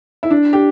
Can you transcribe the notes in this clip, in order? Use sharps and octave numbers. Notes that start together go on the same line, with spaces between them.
E4
D4
G4